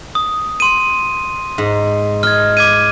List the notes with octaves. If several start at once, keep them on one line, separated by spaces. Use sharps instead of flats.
D#6
C6 D#7
G#2
D#5 F6 G#6
D6 G#6 D#7